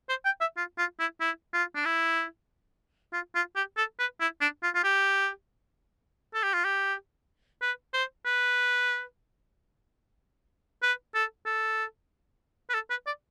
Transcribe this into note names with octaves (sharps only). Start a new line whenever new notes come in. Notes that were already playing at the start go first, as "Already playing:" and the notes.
C5
G5
E5
F4
F4
E4
E4
F4
D4
E4
F4
F4
G4
A4
B4
E4
D4
F4
F4
G4
A4
G4
F4
G4
B4
C5
B4
B4
A4
A4
B4
A4
B4
D5